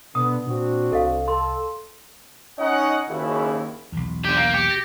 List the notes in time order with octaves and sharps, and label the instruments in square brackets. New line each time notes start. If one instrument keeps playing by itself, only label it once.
[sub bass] B2 [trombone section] D3 B3 [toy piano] D#6
[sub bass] A#2 [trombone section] C4 D4 F#4
[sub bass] C2 [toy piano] A4 D#5 F5
[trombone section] A4 [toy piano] C6
[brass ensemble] C#4 D#4 D#5 F#5
F#1 D#2 C#3 E4
[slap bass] B1 E2
[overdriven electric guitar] D3 G4 [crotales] G6
[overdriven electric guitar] A#3
[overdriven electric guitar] G4 [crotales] D6 C#7 D7
[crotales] A6 A#6 G7